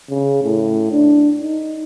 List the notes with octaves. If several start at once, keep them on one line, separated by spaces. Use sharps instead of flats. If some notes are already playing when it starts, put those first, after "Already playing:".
C#3
A2
D4
D#4